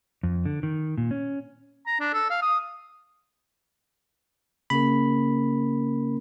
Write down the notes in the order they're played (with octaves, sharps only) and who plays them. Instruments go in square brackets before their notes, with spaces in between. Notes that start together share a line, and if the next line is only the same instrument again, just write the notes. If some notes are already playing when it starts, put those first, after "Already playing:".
[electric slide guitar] F2
D3
D#3
A#2
C#4
[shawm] A#5
D4
A4
F5
D#6
[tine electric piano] C#3 B5 [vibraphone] A#3 C#4 A#4